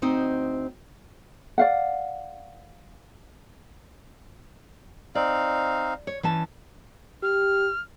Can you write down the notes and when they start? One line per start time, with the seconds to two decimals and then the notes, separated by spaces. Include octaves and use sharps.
0.02 D2 C4 D#4 C5 D#5
1.58 D5 F5 F#5
5.15 C4 D#4 D5 F5
6.07 C#5
6.23 E3 C#4 A5
7.23 G4 F6